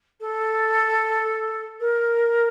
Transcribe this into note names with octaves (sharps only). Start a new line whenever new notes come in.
A4
A#4